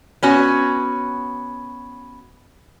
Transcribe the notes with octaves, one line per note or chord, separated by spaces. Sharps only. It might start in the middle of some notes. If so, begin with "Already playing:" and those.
B3 C#4 F#4